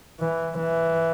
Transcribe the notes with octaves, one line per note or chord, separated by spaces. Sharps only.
E3
E3